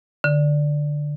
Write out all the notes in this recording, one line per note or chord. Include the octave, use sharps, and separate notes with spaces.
D3